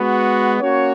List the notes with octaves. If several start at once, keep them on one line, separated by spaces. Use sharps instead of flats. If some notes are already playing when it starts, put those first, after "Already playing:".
Already playing: G#3 B3 F#4
A#3 C#4 F#4 C#5